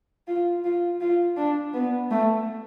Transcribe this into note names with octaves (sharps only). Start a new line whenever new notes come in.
F4
F4
F4
D4
B3
A3